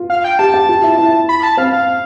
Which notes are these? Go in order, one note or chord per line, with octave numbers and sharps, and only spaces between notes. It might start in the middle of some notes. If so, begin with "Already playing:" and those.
Already playing: F4
F5
G5
G4 A5
G4
F4
E4
E4
B5
A5
C4 F5
F5